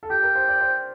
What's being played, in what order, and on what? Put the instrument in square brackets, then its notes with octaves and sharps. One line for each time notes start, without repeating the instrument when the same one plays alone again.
[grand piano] A4
[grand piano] G4 [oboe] G5
[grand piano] A#4
C5
D5
C5